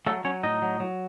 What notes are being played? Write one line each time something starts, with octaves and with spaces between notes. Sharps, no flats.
F#3 A3 A4
F#3 C#4 C#5
A2 D#4 D#5
F#3
F#3